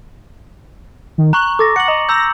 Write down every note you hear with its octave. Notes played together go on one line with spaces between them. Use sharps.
D#3
A#5 C#6 F#6
A4 D6 A6 A#6
F#5 C#7 F#7
D#5 A#5
A#5 E6 G6 A#6